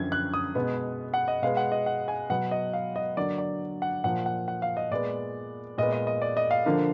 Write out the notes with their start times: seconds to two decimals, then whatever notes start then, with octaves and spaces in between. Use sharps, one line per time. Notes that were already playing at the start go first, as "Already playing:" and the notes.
Already playing: F#2 D3 F3 G#6
0.12 F#6
0.34 D#6
0.55 B2 G#3 B3
1.14 F#5
1.28 D#5
1.42 B2 G#3 B3 F5
1.57 F#5
1.72 D#5
1.86 F#5
2.08 G#5
2.30 B2 F#3 B3 F#5
2.51 D#5
2.73 F5
2.96 D#5
3.16 D3 F#3 A#3 D5
3.38 D5
3.82 F#5
4.04 A#2 F3 A#3 F#5
4.26 F#5
4.48 F#5
4.62 F5
4.77 D#5
4.91 A#2 G#3 B3 D5
5.78 A#2 G#3 B3 D#5
5.93 D#5
6.07 D#5
6.22 D5
6.37 D#5
6.51 F5
6.66 D3 F3 A#3